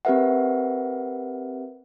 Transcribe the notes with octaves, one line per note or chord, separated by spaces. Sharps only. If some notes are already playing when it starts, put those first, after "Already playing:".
C4 G4 A#4 B4 E5 F#5